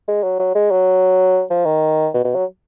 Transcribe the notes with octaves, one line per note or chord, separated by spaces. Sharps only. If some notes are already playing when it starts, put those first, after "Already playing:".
G#3
F#3
F#3
G#3
F#3
F3
D#3
B2
B2
F#3